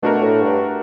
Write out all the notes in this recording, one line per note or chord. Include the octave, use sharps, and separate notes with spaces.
B2 A3 D4 F#4 A#4
A2
G2